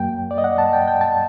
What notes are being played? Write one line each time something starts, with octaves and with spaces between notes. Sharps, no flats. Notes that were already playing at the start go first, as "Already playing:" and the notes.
Already playing: F#2 F#3 A#3 G5
D5
D#5
F#5
A5
G5
G5
A5